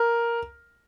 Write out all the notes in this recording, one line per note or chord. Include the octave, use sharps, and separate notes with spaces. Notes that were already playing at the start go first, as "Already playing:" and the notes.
Already playing: A#4